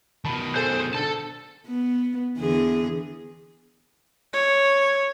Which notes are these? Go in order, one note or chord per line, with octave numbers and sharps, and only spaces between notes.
B2 D#3 A5 B5
G#4 A4 C5
D3 A4 A5
B3
E2 D3 G#4
C#5